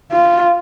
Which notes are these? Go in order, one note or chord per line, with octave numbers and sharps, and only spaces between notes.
F4